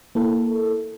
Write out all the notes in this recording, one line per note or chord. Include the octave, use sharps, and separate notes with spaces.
A#3 E4 A4